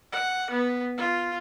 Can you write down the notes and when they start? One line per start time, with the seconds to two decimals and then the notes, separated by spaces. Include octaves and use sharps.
0.12 F#5
0.50 B3
0.97 F4